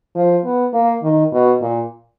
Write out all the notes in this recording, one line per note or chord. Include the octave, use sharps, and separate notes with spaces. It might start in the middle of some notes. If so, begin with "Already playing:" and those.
F3
B3
A#3
D#3
B2
A#2